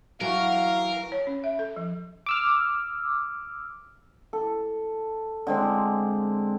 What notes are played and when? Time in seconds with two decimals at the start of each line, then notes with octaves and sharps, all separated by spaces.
0.21 D3 E3 F#3 F#4 A#4 F5
1.12 C#5
1.27 C#4
1.44 E5
1.59 A4
1.76 F3
2.26 D6 E6 F6
4.33 A4
5.47 D3 G#3 C4